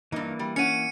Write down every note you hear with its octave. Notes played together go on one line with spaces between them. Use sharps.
G2 E3 A#3 D#4
G3
C#4 C#5 F#5 C#7 D#7